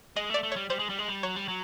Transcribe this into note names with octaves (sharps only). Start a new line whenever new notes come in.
G#3 D#5
A3 D5
A3
G3 C#5
G3 C5
G#3
G3
G#3
G3
F#3 C#5
G3
F#3